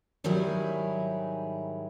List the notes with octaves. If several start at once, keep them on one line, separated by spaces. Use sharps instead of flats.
G#2 D#3 F#3 G3 E4 G#4